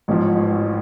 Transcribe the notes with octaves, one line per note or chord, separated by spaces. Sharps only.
A1 G#2 F3